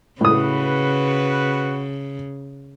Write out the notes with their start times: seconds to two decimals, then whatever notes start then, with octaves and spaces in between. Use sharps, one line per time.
0.21 A2 C#3 F#4 B4 D#6